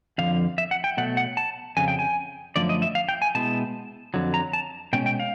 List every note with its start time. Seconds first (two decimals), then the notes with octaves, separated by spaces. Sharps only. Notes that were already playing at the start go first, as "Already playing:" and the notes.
0.18 F2 D3 F3 F5
0.58 E5
0.71 F#5
0.84 G5
0.97 B2 F#3 A3 F#5
1.17 F#5
1.37 A5
1.77 F2 C#3 F#3 G#5
1.88 G5
1.99 G#5
2.56 F#2 D3 F3 A3 D5
2.69 D#5
2.82 E5
2.95 F5
3.09 G5
3.22 G#5
3.35 B2 G#3 B3 E4 A5
4.14 F2 D3 F#3
4.34 A#5
4.53 A5
4.93 B2 G#3 C#4 G5
5.06 G5
5.20 F5